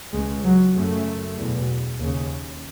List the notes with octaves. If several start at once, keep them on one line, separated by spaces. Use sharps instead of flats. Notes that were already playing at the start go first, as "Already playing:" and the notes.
C#2 C#3 G#3
F#3
F#2 C#3 A3
E2 B2
D#2 C#3